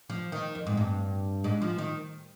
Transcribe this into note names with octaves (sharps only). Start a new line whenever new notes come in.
F3
D#3
F2
G#2
G2
G#2
F3
D#3